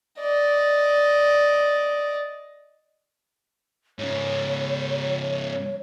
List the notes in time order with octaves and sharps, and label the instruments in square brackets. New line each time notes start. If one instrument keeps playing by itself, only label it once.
[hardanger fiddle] D5 D#5
[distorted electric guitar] G#2 C#3 [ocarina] C#5